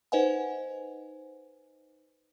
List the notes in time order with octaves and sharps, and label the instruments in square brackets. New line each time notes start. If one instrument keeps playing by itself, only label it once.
[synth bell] D#4 B4 C5 D#5 F#5 G#5